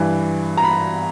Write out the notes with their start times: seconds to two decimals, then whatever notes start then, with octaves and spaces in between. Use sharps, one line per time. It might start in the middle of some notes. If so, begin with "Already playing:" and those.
Already playing: G2 E3
0.57 A#5
0.63 B5